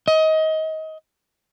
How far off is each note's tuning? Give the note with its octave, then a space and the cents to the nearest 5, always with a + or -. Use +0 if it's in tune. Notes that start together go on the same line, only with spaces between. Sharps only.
D#5 +25